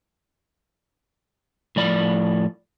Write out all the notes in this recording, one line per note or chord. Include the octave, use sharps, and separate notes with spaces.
A2 F3 D5 B5